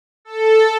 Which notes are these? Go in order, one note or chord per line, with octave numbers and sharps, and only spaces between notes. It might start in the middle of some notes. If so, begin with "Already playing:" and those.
A4